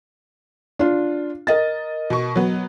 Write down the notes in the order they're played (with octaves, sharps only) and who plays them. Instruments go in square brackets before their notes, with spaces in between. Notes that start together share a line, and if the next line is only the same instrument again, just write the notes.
[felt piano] D4 F4
A#4 D#5 A6
[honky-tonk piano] B2 C#6
F#3 B3